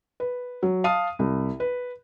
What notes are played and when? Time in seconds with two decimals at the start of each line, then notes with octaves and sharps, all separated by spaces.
0.20 B4
0.63 F#3
0.84 F5 A5 D#6 D#7
1.19 C2
1.60 B4